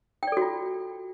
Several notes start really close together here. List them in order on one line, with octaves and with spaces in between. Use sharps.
G5 D5 A4 F#4 F4